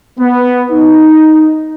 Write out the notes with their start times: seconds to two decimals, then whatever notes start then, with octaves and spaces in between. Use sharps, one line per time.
0.19 B3
0.71 D#4